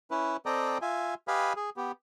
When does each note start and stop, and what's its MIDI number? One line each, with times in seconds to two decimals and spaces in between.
0.11 0.37 61
0.11 0.37 64
0.11 0.37 71
0.46 0.78 60
0.46 0.78 69
0.46 0.78 74
0.46 0.78 75
0.46 0.78 79
0.46 0.78 82
0.82 1.14 65
0.82 1.14 76
0.82 1.14 80
1.28 1.53 67
1.28 1.53 71
1.28 1.53 75
1.28 1.53 77
1.28 1.53 80
1.28 1.53 83
1.56 1.70 68
1.77 1.92 59
1.77 1.92 67